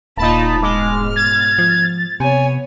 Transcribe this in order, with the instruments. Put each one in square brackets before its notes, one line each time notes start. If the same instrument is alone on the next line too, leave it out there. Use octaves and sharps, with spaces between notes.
[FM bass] D#1 [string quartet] A#2 F4 B5 [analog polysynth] D#4 A5
[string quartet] G#2 B2 F6 [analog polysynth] G#3 [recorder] D6
[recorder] G#6 [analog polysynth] A6
[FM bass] F3
[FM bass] C3 [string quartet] B3 C#5 [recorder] G#5